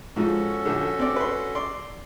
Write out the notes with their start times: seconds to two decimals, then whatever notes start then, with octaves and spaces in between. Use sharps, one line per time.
0.16 G#2 F3 C#4 F#4 A4
0.65 A#1 D3
0.99 C4 D5
1.16 B4 C6
1.55 D5 C6